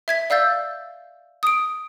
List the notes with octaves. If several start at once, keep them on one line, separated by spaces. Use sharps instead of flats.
E5 G#6 B6
D5 F5 E6 G6 A6
D#6 D7